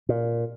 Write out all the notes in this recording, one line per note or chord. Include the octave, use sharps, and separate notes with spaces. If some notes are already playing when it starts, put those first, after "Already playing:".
A#2